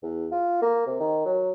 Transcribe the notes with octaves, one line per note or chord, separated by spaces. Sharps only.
E2
F4
A#3
C3
D#3
F#3